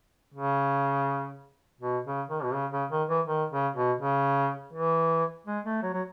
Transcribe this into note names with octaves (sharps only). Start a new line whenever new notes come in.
C#3
B2
C#3
D#3
B2
C#3
C#3
D#3
E3
D#3
C#3
B2
C#3
E3
G#3
A3
F#3
F#3